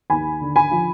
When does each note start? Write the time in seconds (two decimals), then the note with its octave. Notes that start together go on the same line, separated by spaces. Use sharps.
0.10 D#2 G#5 B5
0.41 D3
0.56 G#5 B5
0.71 F3